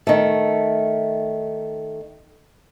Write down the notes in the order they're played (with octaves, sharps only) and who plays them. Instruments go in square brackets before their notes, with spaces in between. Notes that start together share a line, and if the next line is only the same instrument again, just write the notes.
[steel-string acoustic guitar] D#3 A3